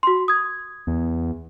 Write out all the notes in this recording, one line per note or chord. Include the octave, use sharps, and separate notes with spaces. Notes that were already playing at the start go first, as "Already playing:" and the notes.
F#4 C6
D#6 G#6
E2